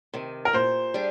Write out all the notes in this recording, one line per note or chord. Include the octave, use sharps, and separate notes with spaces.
C3 D#3
A#4
A#2 C5
G3 D4 G#4